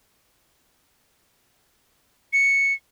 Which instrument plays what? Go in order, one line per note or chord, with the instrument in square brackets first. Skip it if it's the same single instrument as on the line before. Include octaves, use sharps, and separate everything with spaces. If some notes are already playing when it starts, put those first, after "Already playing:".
[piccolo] C#7